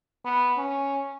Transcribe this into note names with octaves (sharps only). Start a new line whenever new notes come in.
B3
C#4